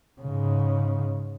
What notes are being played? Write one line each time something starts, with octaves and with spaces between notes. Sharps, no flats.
G#2 C#3